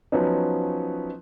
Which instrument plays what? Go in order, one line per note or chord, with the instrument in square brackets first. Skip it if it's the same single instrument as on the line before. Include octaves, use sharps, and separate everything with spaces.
[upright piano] F3 F#3 B3 C#4 D#4